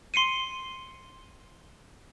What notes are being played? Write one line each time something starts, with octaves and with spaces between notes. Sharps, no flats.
C6 C7 C#7 D#7